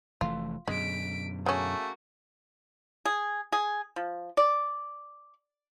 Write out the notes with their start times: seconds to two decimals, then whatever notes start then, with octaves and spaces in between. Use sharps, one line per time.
0.21 F1 E3 A3 F4
0.68 F#2 B2 D3 G#3 B6 D7
1.46 C#3 A3 A#3 C#4 F#4
3.05 G#4
3.52 G#4
3.96 F3
4.37 D5